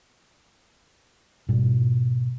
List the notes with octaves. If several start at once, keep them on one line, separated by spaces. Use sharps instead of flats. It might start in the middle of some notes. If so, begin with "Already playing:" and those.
G#2 B2 G3